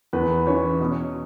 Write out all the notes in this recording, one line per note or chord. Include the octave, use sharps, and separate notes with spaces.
E2 B4
E3 C#4 C#5
B2